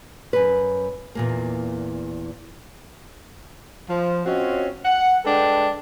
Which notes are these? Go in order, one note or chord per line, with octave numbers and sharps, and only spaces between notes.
F#2 B4
E2 A#2 A#3
F3
C4 C#4 F4 F#4 C#5 D#5
F#5
G#3 D4 A4 B4 G5